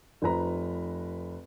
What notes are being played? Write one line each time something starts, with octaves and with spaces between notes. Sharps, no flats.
F1 F3 B4 A#5